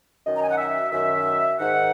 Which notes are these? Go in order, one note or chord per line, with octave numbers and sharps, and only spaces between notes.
F#2 D#3 D#5
A#5
G#5
F#5
E5
F#2 D#3 E5
G#2 D#3 F#5